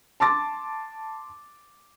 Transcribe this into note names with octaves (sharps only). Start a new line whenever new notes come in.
A5 C6 D6 A6